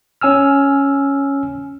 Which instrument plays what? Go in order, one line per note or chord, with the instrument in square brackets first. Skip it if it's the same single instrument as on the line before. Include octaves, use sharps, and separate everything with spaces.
[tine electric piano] C#4 G#5 E6 F6